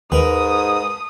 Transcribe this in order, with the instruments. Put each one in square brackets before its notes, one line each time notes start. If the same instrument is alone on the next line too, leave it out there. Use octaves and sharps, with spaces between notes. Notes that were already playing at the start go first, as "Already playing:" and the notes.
[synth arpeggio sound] D#2 [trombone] G#2 [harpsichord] A#4 B4 [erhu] D#6